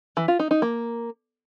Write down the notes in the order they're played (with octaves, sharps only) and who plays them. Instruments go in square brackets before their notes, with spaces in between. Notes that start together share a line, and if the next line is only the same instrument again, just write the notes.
[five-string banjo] E3
F4
D#4
D#4
A#3